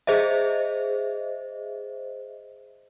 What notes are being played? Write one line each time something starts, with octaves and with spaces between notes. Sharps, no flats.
G#4 C5 D#5 E5